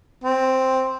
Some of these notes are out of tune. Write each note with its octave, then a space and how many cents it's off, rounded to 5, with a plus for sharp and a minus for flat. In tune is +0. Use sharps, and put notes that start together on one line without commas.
C4 +0